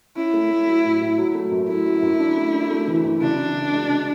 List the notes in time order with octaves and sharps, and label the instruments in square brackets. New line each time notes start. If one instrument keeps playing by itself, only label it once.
[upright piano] C#4 [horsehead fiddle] E4
[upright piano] A3
A3
F#3
A2
A2
F#3
A3
F#2
[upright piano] A3 [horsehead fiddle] E4
[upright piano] F#3
F#2
D4
A3
D4
A3
E3
F#2
[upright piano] C#3 [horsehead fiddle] D4
[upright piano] C#3
C#3
G#3
C#3